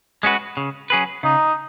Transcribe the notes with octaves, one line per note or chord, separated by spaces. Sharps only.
G#3 C#4 F#4 B4
C#3
F#3 C#4 G#4 B4
C#3 D#4